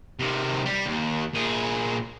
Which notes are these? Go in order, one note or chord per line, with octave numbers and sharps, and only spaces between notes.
C3 D#3
G3
D#2
A#2 G#4